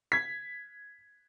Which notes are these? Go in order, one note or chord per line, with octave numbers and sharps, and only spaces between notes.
G#6 B6